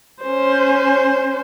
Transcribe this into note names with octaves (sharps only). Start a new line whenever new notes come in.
C#4 C5